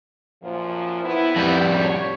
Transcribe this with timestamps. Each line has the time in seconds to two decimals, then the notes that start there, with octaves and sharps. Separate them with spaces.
0.43 F#2 A#2 F3
1.05 A2 B3 E4
1.36 F2 G3
1.77 C#5